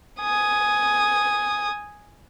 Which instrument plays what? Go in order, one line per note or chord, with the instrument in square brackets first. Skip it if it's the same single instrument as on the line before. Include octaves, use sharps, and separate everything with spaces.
[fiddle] G#5 D#6